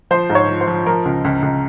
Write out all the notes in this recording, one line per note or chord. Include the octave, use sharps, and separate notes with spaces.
F3 C5
G#2
C#5
F3
C5
F3
F3 A#4
C#2
C#2
C#2